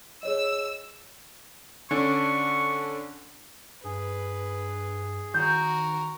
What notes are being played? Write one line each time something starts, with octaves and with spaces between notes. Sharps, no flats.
G#4 C#5 D#5 E6
D3 C#4 D4 C#6
G2 G#4 B4
D#3 F#4 A#4 G6